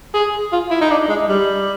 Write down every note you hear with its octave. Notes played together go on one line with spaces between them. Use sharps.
G#4
F4
E4
D#4
D4
G#3
G3